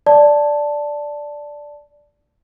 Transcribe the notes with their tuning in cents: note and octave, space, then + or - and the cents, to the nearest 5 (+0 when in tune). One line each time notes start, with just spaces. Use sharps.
D5 +0 A5 +0